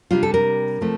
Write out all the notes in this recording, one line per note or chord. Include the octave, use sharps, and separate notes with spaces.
C3 G3 D4 F4
A4
A#4
C3 F3 A3 C4